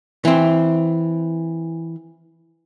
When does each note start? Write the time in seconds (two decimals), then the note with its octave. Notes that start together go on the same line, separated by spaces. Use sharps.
0.25 E3 C4